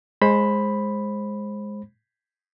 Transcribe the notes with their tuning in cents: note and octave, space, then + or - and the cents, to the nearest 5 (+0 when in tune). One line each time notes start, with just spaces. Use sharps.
G#3 -5 C5 +20 B5 +0